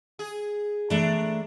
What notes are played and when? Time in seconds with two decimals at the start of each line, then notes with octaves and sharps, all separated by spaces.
0.19 G#4
0.90 E3 A3 D4 A#5